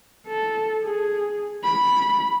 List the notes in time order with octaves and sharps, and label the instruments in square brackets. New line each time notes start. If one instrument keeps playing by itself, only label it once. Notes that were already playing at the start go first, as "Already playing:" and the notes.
[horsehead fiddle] A4
G#4
B5